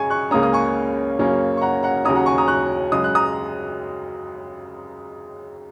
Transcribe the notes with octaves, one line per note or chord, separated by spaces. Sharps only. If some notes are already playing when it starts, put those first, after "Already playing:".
Already playing: F#2 C#3 G#3 G#5 C#6
C#6 F#6
C#2 C#3 A#3 C#4 A#5 D#6
D#6
G#5 C#6
F#2 C#3 A#3 C#4
C#6
F#5 A#5
F#5 A#5
D#2 C#3 F#3 C#4 A#5 D#6
F#5 A#5
G#5 C#6
A#5 D#6
C#6 F#6
F#2 C#3 G#3 D#6
F#6
A#5 D#6